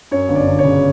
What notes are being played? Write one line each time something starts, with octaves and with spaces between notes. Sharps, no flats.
F#2 C#5
G1
D5
G1
C#5
C#3